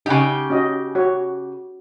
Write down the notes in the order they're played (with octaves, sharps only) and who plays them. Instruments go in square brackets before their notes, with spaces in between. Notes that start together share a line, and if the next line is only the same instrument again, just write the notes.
[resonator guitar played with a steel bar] C#3 G4 [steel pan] D#4 F#5 G#5
[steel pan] C#4 F#4 D#5
F#4 C#5